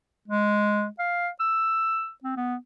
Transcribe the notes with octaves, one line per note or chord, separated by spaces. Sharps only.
G#3
F5
E6
C4
B3